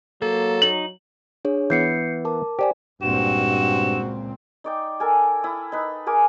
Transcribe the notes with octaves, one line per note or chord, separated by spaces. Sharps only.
F#3 A#3 A4
D#4 F#7
D4 G#4 C#5
E3 B3 G6 C7 C#7
A#4 A5 D6
G4 C5 D5 G#5
C#2 G2 A#2 C4 F#4 E7
D#4 D5 G5
A4 A#4 G#5
E4 D#6
D#4 B4
G#4 A#4 G#5 D6